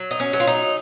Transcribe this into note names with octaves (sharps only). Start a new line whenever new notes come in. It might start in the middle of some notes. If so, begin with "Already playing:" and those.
Already playing: F#3
D#4
C#4
F#3
F4
D#4